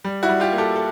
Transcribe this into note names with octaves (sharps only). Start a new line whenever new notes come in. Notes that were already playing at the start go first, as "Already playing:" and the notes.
G3
E4 F#4
G3
F4 G4
A#3
G4 A4
A4